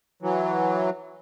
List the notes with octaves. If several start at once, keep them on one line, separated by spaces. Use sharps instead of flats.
E3 F#3